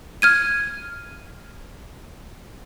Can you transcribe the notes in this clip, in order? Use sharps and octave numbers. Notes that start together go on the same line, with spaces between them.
F6 G#6 D#7